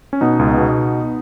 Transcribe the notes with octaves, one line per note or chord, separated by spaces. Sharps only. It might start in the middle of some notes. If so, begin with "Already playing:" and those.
C#4
B2 B3 D#4
C#2
B2